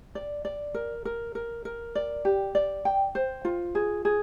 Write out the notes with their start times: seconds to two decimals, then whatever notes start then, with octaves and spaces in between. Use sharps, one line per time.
0.15 D5
0.45 D5
0.74 A#4
1.05 A#4
1.35 A#4
1.65 A#4
1.95 D5
2.25 G4
2.55 D5
2.85 G5
3.15 C5
3.45 F4
3.75 G#4
4.05 G#4